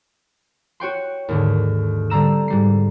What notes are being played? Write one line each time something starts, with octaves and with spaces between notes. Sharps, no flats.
F#4 C#5 G5 C6
D#2 G#2 D3
D3 G3 C4 A#5 E6 E7
G#2 G3 C7